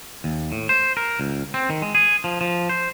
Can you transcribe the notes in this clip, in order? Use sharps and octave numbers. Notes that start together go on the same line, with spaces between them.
D#2
A2
C5
A#4
C#2
C4
D#3
G#3
G#4
F3
F3
C5